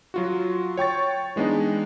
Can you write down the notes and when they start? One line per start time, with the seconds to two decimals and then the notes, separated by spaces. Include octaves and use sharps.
0.14 F#3 F4 F#4
0.77 C#5 G5 C#6 A6
1.36 E3 G#3 B3 D4 D#4